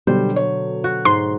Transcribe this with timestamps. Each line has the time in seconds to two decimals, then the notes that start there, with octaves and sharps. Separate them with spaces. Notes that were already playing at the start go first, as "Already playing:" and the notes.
0.07 B2 D3 F#3 G3 C5
0.36 C#5
0.84 F#4
1.05 G#2 C6